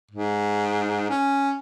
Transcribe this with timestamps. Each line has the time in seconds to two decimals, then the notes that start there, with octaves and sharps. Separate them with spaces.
0.11 G#2
1.10 C#4